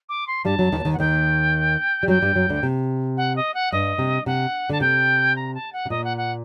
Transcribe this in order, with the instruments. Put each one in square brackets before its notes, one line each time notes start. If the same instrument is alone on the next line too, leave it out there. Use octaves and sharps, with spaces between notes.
[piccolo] D6
C6
[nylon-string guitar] G2 G3 [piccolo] A5
[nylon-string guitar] F#2 F#3
D#2 D#3
F#3
D#2 D#3
[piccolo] F#5
[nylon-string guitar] D#2 D#3 [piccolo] G5
[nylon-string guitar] G3
[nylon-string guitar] F#2 F#3 [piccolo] G5
[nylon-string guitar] G2 G3
F#2 F#3
D2 D3
C3
[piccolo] F#5
D#5
F#5
[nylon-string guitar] G2 [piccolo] D#5
[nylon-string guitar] C3
[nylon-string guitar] C3 [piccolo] F#5
[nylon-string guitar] D3 [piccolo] A5
[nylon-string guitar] C3 [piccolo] G5
[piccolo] A#5
A5
F#5
[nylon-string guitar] C3
[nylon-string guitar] A#2 [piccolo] D#5
[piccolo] F#5
F#5